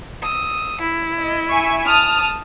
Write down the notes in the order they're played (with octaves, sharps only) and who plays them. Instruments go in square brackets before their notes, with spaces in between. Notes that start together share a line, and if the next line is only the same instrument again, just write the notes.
[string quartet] D#6 E6
E4
[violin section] D#5
E5 G#5 C#6
A5 D#6 F6